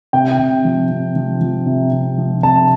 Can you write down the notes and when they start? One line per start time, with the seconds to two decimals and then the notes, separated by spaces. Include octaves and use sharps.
0.13 C3 G5
0.39 C3
0.65 F3
0.90 C3
1.16 F3
1.41 F3
1.66 C3
1.92 C3
2.18 F3
2.43 C3 A5